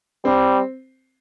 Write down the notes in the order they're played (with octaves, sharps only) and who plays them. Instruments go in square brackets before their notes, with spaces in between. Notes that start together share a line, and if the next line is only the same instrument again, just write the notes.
[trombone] G3 [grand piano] C4